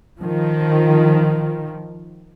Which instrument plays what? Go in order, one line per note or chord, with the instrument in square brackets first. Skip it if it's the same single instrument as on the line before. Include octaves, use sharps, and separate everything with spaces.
[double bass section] D#3 F3